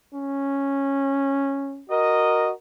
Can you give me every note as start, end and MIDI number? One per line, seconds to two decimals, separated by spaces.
0.14 1.84 61
1.90 2.51 66
1.90 2.51 70
1.90 2.51 75